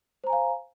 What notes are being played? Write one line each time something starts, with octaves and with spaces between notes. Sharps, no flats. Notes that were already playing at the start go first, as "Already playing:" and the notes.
C5 F5 G#5 A#5